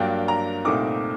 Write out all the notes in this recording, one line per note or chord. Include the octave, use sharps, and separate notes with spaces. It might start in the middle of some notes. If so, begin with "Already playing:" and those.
Already playing: G2 F#3 A#3 D4 G5
A#5
C2 A#2 A3 C4 D#4 D6